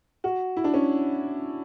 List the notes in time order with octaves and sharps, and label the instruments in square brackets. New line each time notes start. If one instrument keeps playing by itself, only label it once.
[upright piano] F#4
E4
D4
C#4